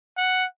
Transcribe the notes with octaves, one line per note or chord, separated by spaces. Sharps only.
F#5